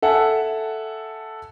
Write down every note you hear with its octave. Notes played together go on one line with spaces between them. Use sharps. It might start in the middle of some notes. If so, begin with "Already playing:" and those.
A4 E5 F#5 G#5 A5